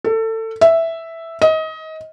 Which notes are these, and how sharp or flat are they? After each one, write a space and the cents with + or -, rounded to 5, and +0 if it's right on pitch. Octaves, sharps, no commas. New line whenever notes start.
A4 +25
E5 +0
D#5 +25